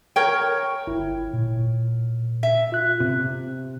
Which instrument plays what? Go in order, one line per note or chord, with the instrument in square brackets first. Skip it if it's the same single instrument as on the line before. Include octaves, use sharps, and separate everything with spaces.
[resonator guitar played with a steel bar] A#4 C#5 G5
[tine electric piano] G1 E4
A#2
[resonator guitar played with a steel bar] E5
[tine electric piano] F4 F#6
[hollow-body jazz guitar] C3